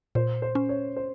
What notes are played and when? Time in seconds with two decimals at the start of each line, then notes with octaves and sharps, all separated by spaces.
0.15 A#2 C5
0.42 C5
0.55 C#4
0.69 C#5
0.96 C5